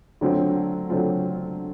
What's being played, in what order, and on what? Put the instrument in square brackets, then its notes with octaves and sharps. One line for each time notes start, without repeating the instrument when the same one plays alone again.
[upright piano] D3 F#3 A3 C4 F4
D3 F#3 A3 C4 F4